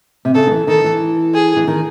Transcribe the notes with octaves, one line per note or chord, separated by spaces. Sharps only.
C3
C#3 A4
D#3
E3
D#3 A4
E3
G#4
E3
D#3